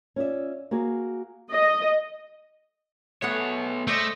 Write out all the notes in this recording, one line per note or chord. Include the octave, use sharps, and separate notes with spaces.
C#4 F4 D5 E5
A#3 F#4 G#4
D#5
A3 B3 G#4 C#5 F#5
A3 C5 D5 D#5